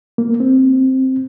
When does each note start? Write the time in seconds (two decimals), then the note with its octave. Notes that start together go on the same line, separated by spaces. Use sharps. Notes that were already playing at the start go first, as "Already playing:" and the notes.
0.18 A#3
0.40 C4